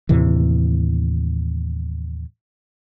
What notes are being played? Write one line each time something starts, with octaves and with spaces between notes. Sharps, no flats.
D#2 A2 C3 E3